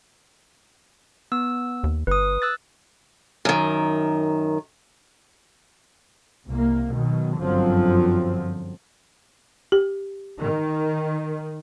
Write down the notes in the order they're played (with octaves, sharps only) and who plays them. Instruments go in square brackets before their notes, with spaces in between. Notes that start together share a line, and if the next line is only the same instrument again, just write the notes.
[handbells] B3 E6
[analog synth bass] D#2
[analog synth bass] G1 [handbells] B4 D#6
[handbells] E6 F#6 A6
[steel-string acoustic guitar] F#2 D#3
[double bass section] C2 A#3
B2 D#3 F#3
G1 F#2 D3 F3 F#3 C4
[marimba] G4
[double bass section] D#3